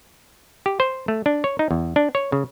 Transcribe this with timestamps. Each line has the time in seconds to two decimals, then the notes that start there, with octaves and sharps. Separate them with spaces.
0.66 G4
0.80 C5
1.08 A3
1.26 D4
1.44 C#5
1.59 D#4
1.71 E2
1.96 D4
2.15 C#5
2.32 C#3